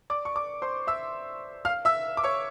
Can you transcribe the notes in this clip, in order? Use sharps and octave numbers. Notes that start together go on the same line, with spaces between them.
D5 D6
C#6
D5 D6
C5 C6
E5 E6
F5 F6
E5 E6
D6
C#5 C#6